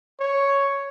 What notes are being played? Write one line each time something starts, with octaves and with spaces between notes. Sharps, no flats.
C#5